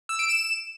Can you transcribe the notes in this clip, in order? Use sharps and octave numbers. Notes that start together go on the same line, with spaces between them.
E6
D7
E7